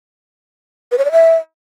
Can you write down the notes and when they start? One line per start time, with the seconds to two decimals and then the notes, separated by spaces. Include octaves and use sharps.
0.92 B4
0.98 C#5
1.05 D5
1.12 E5